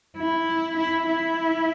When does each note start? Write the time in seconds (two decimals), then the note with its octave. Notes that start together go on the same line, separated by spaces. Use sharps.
0.18 E4
0.78 E4
1.07 E4